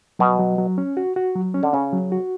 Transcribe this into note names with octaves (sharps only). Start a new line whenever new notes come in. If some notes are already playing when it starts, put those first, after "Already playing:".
B2 F#3
F#3
F#3
C#4
F#4
F#4
F#3
C#4
D3
C#3 C#4
F#3
F#4